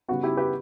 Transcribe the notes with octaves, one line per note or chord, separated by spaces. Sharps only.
C#3 G3 B3 F#4
E4 G4
G4 B4